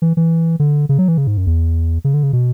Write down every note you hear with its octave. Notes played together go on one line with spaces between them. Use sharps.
E3
E3
D3
C#3
F#3
E3
C#3
G#2
F#2
E2
C#3
D3
C#3
B2